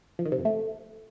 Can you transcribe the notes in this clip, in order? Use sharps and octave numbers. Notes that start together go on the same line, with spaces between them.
F3
D#3
C3
F2
A3